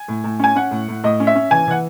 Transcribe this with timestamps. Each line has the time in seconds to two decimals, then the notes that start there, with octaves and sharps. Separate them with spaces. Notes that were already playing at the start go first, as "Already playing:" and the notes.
Already playing: G#5
0.08 A2
0.24 A2
0.40 C#4 G#5
0.56 C#4 F#5
0.71 A2
0.88 A2
1.04 A2 D#5
1.20 C#4
1.27 E5
1.35 C#4
1.51 E3 G#5
1.68 E3 F#5